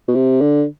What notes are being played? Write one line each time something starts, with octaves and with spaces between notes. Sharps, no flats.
B2
C3
D3